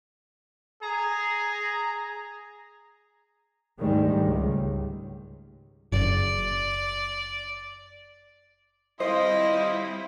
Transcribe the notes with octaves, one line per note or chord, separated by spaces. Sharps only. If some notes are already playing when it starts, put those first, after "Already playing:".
G#4 A#5
D2 G#2 D#3 G3 G#3
C#2
F#1 D5
G3 C4 E4 C5 D#5 F5 C6 D#6